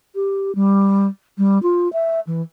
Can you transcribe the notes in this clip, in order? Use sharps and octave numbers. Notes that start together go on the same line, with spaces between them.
G4
G3
G3
F4
E5
E3